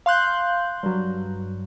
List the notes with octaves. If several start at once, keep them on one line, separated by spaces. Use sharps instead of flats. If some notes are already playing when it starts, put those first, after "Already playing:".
F5 C6 F#6 G6
G2 F#3